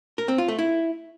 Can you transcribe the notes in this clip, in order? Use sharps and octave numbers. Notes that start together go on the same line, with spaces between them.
A#4
C4
F4
A3
E4